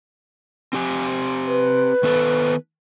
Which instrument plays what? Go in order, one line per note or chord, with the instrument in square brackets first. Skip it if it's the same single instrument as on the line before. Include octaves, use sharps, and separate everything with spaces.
[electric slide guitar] C4 G4 G#5
[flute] B4
[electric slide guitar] D#3 B3 A4